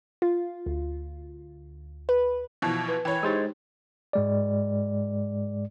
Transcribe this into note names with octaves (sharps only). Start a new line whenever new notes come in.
F4
D2
B4
B2 E3 F3
B4
E3 C#5 G5 B5
G#3 D#4 G4 C5 A6
G#2 G#3 D5